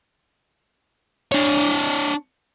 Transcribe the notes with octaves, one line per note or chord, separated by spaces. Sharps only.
D4 C#5